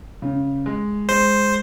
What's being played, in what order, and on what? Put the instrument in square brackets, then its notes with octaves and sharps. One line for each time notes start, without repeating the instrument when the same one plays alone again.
[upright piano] C#3
G#3
[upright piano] G#3 [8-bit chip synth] C5